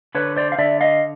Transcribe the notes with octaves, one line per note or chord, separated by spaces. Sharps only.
D3 B4 C#5
C5 D5
F5
D3 D5 E5
D#5 F5